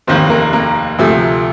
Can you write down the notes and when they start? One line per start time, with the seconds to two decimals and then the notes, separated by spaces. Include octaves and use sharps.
0.07 F1 D#2 D#3 A#3 C4 C5
0.30 A#3 A#4
0.53 A#3 A#4
0.98 D2 C3 F3 A3